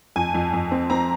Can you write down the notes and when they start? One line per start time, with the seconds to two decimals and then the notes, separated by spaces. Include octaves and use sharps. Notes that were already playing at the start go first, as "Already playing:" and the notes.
0.16 F2 G#5
0.34 F2
0.53 F2
0.71 C4
0.90 C4 A#5